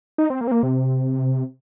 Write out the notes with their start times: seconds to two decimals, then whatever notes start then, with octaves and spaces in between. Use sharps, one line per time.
0.18 D#4
0.30 C4
0.41 A#3
0.48 C4
0.52 A#3
0.63 C3